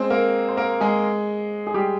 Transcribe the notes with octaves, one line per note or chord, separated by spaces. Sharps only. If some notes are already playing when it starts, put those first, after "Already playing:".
Already playing: G#3 C4 G#4 C5
A#3 A#4
C5
A#3 A#4
G#3 G#4
G#4
G3 G4